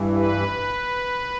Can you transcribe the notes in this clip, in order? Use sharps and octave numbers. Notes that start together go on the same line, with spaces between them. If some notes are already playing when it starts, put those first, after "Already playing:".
Already playing: G2 E3
B4